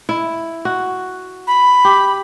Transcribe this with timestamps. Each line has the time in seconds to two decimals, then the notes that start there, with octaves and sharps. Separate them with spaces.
0.09 E4
0.65 F#4
1.47 B5
1.85 G4